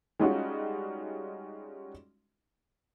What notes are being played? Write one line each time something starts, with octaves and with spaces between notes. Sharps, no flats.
G3 G#3 C#4 D#4 F4 F#4